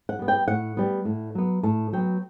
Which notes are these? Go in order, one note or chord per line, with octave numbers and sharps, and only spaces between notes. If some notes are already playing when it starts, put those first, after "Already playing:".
F#5
G3 B3
G5
A2 F#5
G3 B3
A2
F#3 B3
A2 A5
F#3 B3 G5